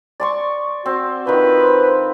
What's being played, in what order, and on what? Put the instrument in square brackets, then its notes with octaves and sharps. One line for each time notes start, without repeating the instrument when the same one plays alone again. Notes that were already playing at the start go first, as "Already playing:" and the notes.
[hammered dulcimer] D5 C6 C#6
[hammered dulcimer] C4 [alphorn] F#4
[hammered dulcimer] D#3 F3 [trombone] B4
[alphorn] C5